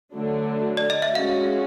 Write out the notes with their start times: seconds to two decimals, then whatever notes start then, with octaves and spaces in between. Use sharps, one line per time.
0.14 D3 F#3 A3 D4
0.77 D5
0.90 D#5
1.02 E5
1.15 G#3 C#4 F#4 F5